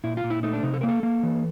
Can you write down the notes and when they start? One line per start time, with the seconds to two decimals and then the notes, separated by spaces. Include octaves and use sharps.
0.04 A#2 E4
0.17 F4
0.24 A#2
0.30 E4
0.43 A3 D#4
0.53 D4
0.63 C3 D#4
0.74 A4
0.81 A#3 A#4
0.88 A4
1.03 A#3
1.23 E3